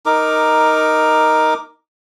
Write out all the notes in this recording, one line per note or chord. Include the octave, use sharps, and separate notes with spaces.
D#4 A#4 D6